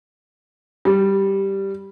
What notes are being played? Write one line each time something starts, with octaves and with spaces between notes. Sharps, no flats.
G3